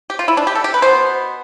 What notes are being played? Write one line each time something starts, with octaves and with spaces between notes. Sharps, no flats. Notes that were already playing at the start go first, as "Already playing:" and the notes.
G4
F4
E4
D4
G4
A4
G4
B4
B2 B3 C5